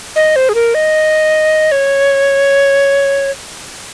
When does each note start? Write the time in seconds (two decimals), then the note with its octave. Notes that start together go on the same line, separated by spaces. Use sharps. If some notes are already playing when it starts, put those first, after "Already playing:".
0.16 D#5
0.36 C5
0.49 G#4
0.55 A#4
0.75 D#5
1.72 C#5